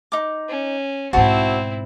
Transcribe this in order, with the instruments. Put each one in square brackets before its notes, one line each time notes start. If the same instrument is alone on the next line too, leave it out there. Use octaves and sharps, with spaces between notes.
[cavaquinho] D#4 D6
[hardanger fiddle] C#4
[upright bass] B1 G#2 [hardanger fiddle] C4 E4 [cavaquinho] F#4 C5 A5